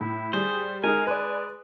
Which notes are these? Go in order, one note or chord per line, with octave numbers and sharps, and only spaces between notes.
A2 E4
G3 G#4 C5
G#3 D#4 G#4 A#4 G#5
G#3 B4 D5